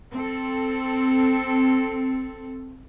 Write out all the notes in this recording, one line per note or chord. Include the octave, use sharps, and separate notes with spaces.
C4 A4